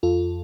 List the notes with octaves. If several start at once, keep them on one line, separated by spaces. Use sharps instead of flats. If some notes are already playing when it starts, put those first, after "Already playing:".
F2 F4 A4